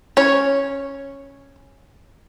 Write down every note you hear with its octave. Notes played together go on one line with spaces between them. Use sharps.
C#4 C#5